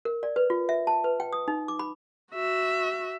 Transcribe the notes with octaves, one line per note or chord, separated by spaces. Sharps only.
A#4
D5
B4
F4
E5
A5
B4
G5
D#6
D#4
D6
B5
F#4 E5